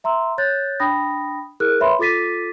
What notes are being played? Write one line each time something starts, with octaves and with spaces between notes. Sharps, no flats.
E5 A#5 C6 E6
C#5 F#6 G6 A6
D4 G5 B5 D#6 A#6
E4 G#4 A#4 F6 F#6
B4 C#5 E5 B5 C6
F4 A4 D6 A6 B6 D#7